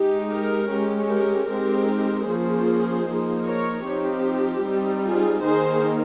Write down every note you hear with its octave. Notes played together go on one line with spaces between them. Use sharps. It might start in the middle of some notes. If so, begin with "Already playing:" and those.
Already playing: G#3 D#4 G4
G4 A#4
G#3 C#4 G4
G4 A#4
G#3 C4 D#4 G4 A#4
F3 A#3 C#4 G#4 C5
F3 A#3 D#4
A#4 C#5
F3 C4 D#4 G4
G3 C4 D#4
F4 G#4
D#3 A#3 D#4 G#4 C5